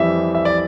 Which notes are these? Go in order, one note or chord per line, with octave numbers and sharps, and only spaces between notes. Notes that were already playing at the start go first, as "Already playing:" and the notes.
Already playing: F2 E3 G3 E5
E5
D5